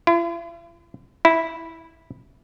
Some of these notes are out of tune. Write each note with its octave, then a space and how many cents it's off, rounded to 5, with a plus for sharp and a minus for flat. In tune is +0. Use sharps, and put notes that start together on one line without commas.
E4 +45
E4 -10